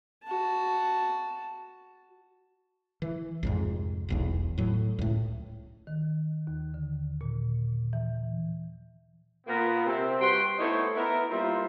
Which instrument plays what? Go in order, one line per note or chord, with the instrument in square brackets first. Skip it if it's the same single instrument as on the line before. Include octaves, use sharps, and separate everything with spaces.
[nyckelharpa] F#4 A5
[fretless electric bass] E3
C2 F2 G#2
E1 B1 E2
A2 F#3
C#2 A2
[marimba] D#3
D#2
D3
A#2
E3
[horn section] A#2 A#3 B3
C3 C4
G3 F#4 B4 G5 C6
A3 B3 D#4 E4 C5 C#5
B3 E4 A#4
G3 A#3 E4 F4 C5